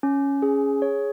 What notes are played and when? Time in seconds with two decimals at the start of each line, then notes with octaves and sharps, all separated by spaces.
0.03 C#4
0.42 G#4
0.82 C#5